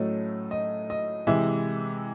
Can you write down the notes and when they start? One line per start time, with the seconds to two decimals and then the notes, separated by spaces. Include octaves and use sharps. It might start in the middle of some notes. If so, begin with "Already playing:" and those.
Already playing: A2 F#3 A3 C#4 D#5
0.51 D#5
0.90 D#5
1.27 C3 E3 G#3 E5